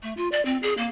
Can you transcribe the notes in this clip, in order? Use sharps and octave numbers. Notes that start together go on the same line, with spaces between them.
A3
F4
D5
C4
G#4
A#3